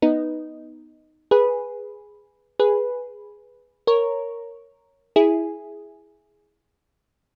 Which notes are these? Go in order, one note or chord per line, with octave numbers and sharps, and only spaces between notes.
B3 D#4
G#4 B4
G#4 B4
A#4 C#5
E4 G#4